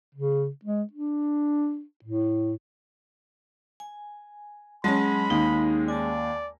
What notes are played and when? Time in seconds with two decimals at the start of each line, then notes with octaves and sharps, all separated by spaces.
0.15 C#3
0.65 G#3
0.92 D4
2.04 A2
3.80 G#5
4.84 F#3 G#3 C#4 A5 B5 C6 A#6
5.30 D#2 D#4
5.88 D5 G#5 A5